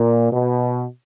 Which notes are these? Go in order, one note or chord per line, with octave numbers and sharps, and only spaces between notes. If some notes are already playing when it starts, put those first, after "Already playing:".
Already playing: A#2
B2